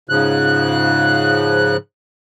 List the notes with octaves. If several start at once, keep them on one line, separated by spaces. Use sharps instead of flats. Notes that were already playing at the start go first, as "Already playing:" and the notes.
G#2 C#3 F3 F#6